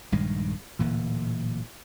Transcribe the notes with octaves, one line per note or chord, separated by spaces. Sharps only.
A#1 G2 D#3 G#3
D1 A#2 E3